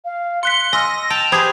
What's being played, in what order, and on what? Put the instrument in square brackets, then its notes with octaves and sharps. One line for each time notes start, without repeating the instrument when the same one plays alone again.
[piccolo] F5
[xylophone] C6 F#6 B6 [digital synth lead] C#7 [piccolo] G7
[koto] D#5 [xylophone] G#5 C6 F6 [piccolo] E6 [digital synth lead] A#6
[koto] G5 [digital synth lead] A5 [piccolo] F7
[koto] G4 G#4 B4 [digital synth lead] C5 [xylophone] B5 D#6 G#6